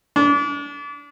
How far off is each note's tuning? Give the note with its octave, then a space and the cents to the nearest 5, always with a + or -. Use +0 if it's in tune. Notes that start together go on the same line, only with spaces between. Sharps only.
D4 -35